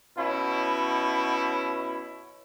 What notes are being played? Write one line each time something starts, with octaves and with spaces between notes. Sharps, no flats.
B2 C#4 E4